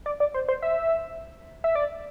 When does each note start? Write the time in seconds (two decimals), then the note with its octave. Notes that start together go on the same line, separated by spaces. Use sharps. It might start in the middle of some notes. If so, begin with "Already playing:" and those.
0.06 D5
0.20 D5
0.34 C5
0.48 C5
0.62 E5
1.64 E5
1.75 D5